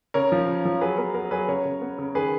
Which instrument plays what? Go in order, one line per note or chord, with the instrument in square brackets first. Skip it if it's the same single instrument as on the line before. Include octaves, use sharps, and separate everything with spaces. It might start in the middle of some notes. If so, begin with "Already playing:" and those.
[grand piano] C#3 A#4 C#5
F3
C#3
F3
F#3 G#4 B4
B3 A#4
B3 A#4
F#3 G#4 B4
C#3 A#4 C#5
C#3
B3
C#3
D#3 G#4 B4